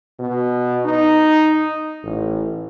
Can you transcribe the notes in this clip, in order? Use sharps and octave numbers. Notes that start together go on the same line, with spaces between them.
B2
D#4
A1